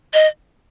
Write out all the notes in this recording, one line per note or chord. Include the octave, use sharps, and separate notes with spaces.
D#5